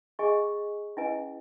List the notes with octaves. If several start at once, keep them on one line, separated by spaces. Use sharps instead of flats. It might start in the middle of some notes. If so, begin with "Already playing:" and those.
G#4 D#5 G#5 C#6
C#4 E4 B4 D#5 G#5